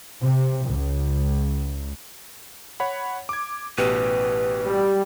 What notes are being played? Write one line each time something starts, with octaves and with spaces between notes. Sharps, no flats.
C3
C#2
C#5 F#5 B5
D6 G#6
A1 B2 G4 B4
G3